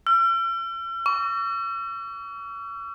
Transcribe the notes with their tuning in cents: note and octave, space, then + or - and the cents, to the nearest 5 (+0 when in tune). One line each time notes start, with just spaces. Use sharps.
E6 +45
C#6 +40